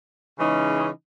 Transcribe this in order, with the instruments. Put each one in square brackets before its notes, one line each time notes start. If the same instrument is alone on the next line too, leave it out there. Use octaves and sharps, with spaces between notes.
[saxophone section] C#3 E3 G#3 C#4 D#4